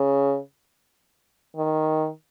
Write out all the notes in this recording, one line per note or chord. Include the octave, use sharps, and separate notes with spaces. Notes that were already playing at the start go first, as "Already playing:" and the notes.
Already playing: C#3
D#3